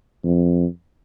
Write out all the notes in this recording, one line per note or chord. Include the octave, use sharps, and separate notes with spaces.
F2